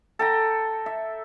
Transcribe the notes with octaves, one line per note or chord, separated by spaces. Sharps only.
A4 G5 A#5
E5